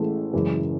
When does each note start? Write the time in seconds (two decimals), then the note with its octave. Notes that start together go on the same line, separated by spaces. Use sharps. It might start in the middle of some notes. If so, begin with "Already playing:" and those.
Already playing: A1 A2 E3 G#3 A3
0.33 F#1 F#2 E3 G#3